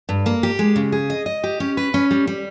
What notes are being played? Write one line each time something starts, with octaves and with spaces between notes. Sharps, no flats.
G2
A#3
G4
G#3
C#3
G#4
D#5
D#5
G4
C#4
B4
C#4
G3
G3